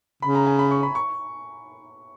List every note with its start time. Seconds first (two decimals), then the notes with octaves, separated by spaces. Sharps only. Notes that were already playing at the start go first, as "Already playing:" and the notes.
0.22 C#3 B5
0.35 A#5
0.47 G#5
0.59 B5
0.71 C#6
0.83 B5
0.95 C#6